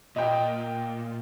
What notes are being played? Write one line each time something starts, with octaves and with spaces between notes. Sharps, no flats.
A#2 D#5 G5